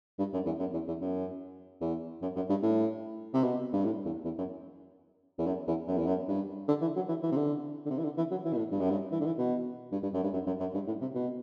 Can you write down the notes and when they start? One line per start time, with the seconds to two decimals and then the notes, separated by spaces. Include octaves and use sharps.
0.19 G2
0.33 F#2
0.46 E2
0.59 F#2
0.73 E2
0.88 E2
1.01 F#2
1.81 E2
2.22 F#2
2.36 F#2
2.49 G2
2.63 A2
3.34 C3
3.43 B2
3.73 G2
3.85 A2
4.05 E2
4.24 E2
4.38 F#2
5.38 E2
5.46 F#2
5.67 E2
5.88 F#2
5.97 E2
6.07 F#2
6.28 G2
6.68 D3
6.81 E3
6.96 F#3
7.08 E3
7.23 E3
7.32 C3
7.36 D3
7.86 D3
7.91 C3
7.98 E3
8.04 D3
8.17 E3
8.31 F#3
8.45 E3
8.53 B2
8.57 A2
8.71 G2
8.80 F#2
8.90 G2
9.12 E3
9.21 D3
9.26 E3
9.38 B2
9.92 G2
10.03 G2
10.14 F#2
10.23 G2
10.33 F#2
10.46 F#2
10.60 F#2
10.74 G2
10.87 A2
11.01 C3
11.15 B2